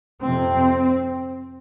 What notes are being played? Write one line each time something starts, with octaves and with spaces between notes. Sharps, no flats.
F2 C3 C4